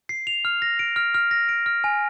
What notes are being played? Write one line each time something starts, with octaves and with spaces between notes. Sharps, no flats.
C7
F7
F6
A#6
D7
F6
F6
A#6
D7
F6
G#5